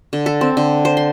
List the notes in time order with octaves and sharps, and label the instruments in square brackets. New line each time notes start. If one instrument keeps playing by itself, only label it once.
[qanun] D3
A4
C4
D3
C5
C6